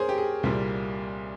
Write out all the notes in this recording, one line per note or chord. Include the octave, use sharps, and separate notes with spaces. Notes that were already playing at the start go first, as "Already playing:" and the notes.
Already playing: G#4 A#4 C5 C#5
G4
G#4
C2 A#2 G3 A#3